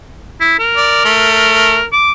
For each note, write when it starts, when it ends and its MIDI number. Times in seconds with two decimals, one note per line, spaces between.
0.40 0.55 64
0.59 1.86 70
0.77 1.01 74
1.05 1.78 57
1.93 2.12 86